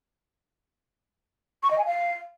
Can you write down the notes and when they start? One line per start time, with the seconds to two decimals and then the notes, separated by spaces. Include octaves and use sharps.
1.63 C#6
1.71 D#5
1.78 G#5
1.86 F5